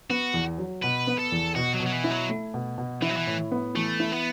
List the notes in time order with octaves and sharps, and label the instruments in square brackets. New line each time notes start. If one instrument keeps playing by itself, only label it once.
[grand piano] B3 [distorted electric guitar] F#4
[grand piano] E2
F#3
[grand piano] B2 [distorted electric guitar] B4
[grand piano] B3
[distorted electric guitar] A4
[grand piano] E2
[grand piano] B2 [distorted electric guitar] F#4
[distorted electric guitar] F#3
[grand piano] B2
[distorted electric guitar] F#3
E3
[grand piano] E4
[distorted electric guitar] F#3
[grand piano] A3
B2
B2
[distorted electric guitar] E3 [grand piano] E4
[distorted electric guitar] F#3
E3
[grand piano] A2
B3
[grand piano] E3 [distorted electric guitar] A3
[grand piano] E4
[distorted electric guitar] B3